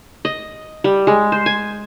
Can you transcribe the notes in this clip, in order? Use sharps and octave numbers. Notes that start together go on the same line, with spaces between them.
D#5
G3
G#3
C5
G#5